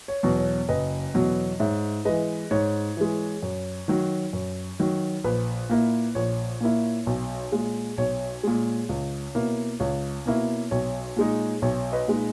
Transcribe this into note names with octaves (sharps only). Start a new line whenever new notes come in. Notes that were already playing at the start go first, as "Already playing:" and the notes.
C#5
E2 B2 F#3
C#5
F#1 B4 D#5
E2 B2 F#3
G#2 C#5 E5
E3 G#3 B4 D#5
G#2 C#5
E3 G#3
F#2
D#3 F#3
F#2
D#3 F#3
A#1 B4
A#2 A#3 E4
A#1 C#5
A#2 A#3 E4
B1
A#2 G#3
B1 C#5
A#2 G#3
C#2
B2 A#3 E4
C#2 C#5
B2 A#3 E4
B1 C#5
A#2 G#3 D#4
B1 C#5
B4 D#5
A#2 G#3 D#4